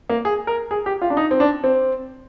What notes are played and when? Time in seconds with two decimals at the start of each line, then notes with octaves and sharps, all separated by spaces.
0.09 A#3
0.25 G#4
0.47 A#4
0.71 G#4
0.86 G4
1.02 F4
1.10 D4
1.17 D#4
1.31 C4
1.40 D4
1.64 C4